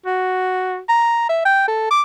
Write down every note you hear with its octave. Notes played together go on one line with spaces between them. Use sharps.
F#4
A#5
E5
G5
A4
D6